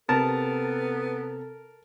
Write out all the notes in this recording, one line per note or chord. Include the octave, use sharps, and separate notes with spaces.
C3 B3 A4 A#4 A5